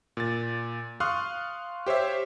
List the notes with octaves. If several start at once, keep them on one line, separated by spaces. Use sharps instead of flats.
A#2 A6
F5 C6 C#6 D#6 F6 F#6
G4 C5 C#5 E5